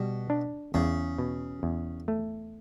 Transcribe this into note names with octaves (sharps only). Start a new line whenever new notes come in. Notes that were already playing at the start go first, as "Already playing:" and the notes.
Already playing: B2 G3
D4
E2 C#3
B2
E2
A3